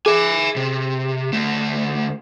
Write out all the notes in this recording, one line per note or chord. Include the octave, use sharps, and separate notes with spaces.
G#4 E5 G#5
C3
D2 A3